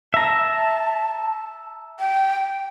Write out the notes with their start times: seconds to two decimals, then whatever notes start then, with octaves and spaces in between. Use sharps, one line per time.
0.14 E5 A5 A#5
1.99 G5